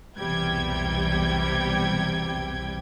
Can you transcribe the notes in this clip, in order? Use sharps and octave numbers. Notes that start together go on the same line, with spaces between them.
B1 E2 C3 G3 G5 G#6